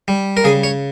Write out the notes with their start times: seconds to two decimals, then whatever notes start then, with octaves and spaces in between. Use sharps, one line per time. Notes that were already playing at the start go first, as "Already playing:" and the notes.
0.08 G3
0.37 A#4
0.44 C#3 G#4
0.63 C#5